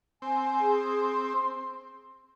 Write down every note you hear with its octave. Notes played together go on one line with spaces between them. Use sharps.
C4 G#5
G#4
C6